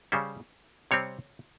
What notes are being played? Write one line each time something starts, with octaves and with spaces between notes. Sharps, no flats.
C#3 G3 C#4 C5
C3 G3 C4 C#5